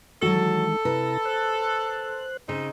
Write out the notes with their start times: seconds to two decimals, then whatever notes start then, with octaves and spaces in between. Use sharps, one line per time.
0.22 D#3 E3 F#3 G#3 F#4 A4
0.85 C3 E4 B4 A#5
1.25 C5 F#6
2.49 C#3 C4 D#4